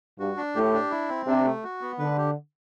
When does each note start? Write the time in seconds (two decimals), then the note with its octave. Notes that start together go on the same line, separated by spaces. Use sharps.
0.19 G2 F#4
0.37 D4
0.55 A2 G4
0.73 D4
0.91 E4
1.09 C4
1.27 C3 D4
1.45 A3
1.64 F#4
1.81 B3
1.98 D3 B4
2.17 G4